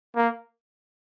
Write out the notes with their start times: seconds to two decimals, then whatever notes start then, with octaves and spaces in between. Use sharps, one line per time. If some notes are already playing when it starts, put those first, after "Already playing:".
0.16 A#3